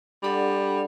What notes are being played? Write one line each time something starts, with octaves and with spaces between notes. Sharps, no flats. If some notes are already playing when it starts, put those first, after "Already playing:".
G3 D4 A4 D5 F#5